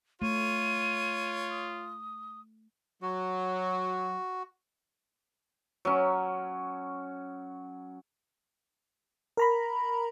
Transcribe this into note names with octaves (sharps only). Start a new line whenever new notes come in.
A3 F4 C#5 D#7
D#6
F#3 F#4
F#3 C#4
A#4 A#5 B5